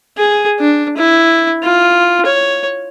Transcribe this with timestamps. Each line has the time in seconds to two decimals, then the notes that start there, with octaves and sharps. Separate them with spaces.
0.18 G#4
0.60 D4
0.97 E4
1.63 F4
2.26 C#5